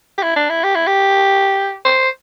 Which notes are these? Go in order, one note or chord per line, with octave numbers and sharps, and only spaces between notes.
G4
E4
D4
E4
G4
E4
G4
C5